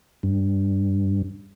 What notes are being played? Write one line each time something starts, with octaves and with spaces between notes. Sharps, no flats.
G2